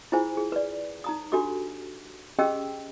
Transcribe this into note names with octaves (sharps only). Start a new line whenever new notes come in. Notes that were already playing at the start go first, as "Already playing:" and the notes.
E4 F4 G#4 C5 G#5
G#4
B4 D5
D#4 A#5 D#6
D4 F#4 G4 A4 D6
C#4 G4 G#4 D#5 G5 E6